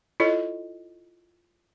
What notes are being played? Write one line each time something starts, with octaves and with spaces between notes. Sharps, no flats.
E4 F4 A4 C#5 D#5